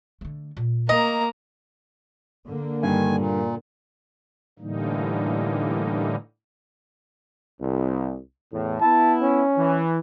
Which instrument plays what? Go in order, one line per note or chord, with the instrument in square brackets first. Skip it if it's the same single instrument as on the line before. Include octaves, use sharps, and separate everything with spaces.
[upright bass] D3 A3
A#2
[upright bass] A3 [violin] A#3 A#5 [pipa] D#5
[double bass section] D3 A#3
[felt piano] G2 [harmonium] D#3 G#5
[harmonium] A#2
[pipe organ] A2 D3 E3 G3 A#3 D#4
[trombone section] C2
E2 A2
[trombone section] B3 E4 [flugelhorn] A5
[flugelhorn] C#4
[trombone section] E3